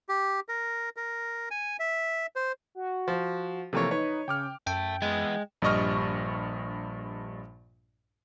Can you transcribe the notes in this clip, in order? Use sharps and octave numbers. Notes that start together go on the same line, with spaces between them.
G4
A#4
A#4
G#5
E5
C5
F#4
F3
C3 E3 F3 A3 A#3 C#5
D#4 B4 C#5
C#3 G5 D6 F6
F#2 E5 G5 A5
E2 G#3 B3
A#1 G2 G3 D#5 C#6 F6